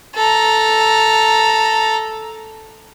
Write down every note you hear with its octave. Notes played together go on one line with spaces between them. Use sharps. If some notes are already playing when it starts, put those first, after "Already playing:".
A4 A#5